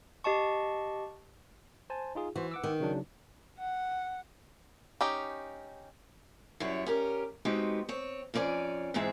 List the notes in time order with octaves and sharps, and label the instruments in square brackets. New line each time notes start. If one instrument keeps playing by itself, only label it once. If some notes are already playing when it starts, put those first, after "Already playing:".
[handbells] G4 D#5 A5 C#6
[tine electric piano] C5 G#5 A5
D#4 F4 G#4
[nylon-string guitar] E3 [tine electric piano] F#4 C5
[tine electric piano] F#5 D6 E6
[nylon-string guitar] D#3
[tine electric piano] C#3 F#3 D4
[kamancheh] F#5
[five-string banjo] C#4 D#4 G4
[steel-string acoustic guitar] F#2 G3 E4 C#5
C#4 G4 A#4
G#3 B3 C4 D#4 F#4 G4
C4 C#5
F2 C4 C#4 D5 G#5
G#2 B2 E3 C4 G#4 E5